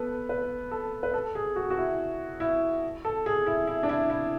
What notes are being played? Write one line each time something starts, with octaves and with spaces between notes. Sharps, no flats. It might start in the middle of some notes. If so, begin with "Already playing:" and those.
Already playing: B3 A4 B4
B4
A4
B4
A4
G#4
F#4
F#4
E4
E4
A4
G#4
E4
E4
D4
E4
E4